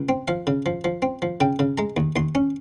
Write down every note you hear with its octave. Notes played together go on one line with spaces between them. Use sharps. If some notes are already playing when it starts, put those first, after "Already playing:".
Already playing: C#2
C4
F3 F5
C#3
F3
F3
C4
F3
C#3 G5
C#3
G#3 A#5
D#2
D#2 C6
C#4